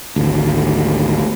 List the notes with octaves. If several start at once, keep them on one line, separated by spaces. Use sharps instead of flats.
G#1 D2